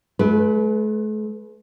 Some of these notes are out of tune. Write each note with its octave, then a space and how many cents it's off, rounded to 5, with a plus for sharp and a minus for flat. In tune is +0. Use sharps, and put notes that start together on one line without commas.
A3 -45 B4 +0